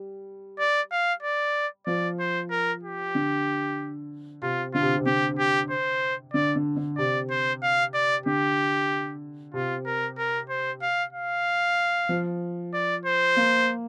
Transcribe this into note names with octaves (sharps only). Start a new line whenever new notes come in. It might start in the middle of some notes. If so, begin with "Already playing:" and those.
Already playing: G3
D5
F5
D5
F3 D5
C5
A#4
G4
D3
C3 F4
D3 F4
C3
C3
D3 G4
G4
C5
D3 D5
D3
D3
C3 D5
C5
F5
D5
D3 G4
C3 F4
A#4
A#4
C5
F5
F5
F3
D5
C5
A#3